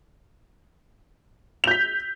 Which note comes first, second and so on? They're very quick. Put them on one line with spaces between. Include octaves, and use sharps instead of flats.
F7 G6 B6